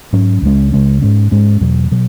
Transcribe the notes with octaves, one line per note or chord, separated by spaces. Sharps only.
G#2 F#3 C#4
C#2 C#3 G#3 C#4
C#2 C#3 G#3 C#4
G#2 G#3 C#4
G#2 G#3 C#4
E2 B2 F#3
B2 F#3